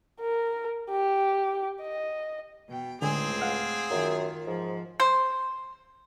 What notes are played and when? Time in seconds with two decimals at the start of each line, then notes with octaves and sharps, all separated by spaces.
0.21 A#4
0.90 G4
1.82 D#5
2.69 B2 G5
3.02 C#2 A2 D3 G#3 C4 G#4 G#5
3.41 F5 F#5 F6
3.90 F#2 D#3 F4
4.47 G#2 F3
5.00 C5